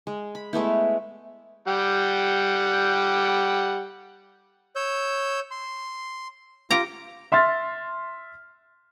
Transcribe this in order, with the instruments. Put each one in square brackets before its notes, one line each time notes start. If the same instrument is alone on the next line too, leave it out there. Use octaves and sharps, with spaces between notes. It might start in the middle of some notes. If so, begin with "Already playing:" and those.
[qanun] G#3
B5
G#3 A3 B3 E4
[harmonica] G3 F#5 G5
[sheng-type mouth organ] C#5 E6 G6
C6
[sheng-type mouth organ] F4 [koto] G4 A#5
[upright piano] E5 C6 F6 A6